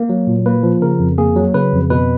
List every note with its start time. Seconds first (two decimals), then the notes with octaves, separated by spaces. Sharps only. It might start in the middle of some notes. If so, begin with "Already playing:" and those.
Already playing: A#3
0.09 F#3
0.27 A#2
0.46 A#3 B4
0.63 F3
0.82 C#3 A#4
1.00 F2
1.18 A#3 G#4
1.36 F#3
1.54 C#3 B4
1.73 F2
1.90 B2 B4